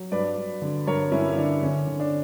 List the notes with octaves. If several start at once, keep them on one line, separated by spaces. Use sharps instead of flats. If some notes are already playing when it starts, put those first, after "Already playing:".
Already playing: F#3
G2 B4 D5
G2
D3
G2 A#4 C#5
G2 C#4 E4
E4
D3 D4
D3 C#4
D3
D4